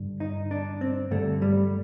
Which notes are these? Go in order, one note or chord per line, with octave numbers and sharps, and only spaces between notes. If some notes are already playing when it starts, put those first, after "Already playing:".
Already playing: G2 D3
D#4
D4
C4
G2 D3 A3
G3